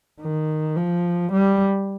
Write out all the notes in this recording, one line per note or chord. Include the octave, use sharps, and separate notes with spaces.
D#3
F3
G3